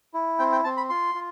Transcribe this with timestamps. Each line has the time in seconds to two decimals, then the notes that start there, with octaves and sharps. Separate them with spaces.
0.14 E4
0.39 C4 G5
0.52 G5
0.64 C4 A5
0.77 B5
0.90 F4 C6
1.15 F4